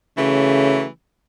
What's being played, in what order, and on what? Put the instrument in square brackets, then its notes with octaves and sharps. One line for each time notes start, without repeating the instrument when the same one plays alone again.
[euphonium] C#3 [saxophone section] E3 F#3 A3